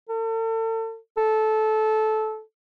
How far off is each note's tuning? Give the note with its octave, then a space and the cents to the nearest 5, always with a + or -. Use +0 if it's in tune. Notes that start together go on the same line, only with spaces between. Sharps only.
A4 +40
A4 -15